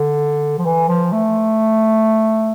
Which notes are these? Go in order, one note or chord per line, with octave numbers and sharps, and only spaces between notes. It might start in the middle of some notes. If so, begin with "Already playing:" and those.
Already playing: D3
F3
E3
F3
A3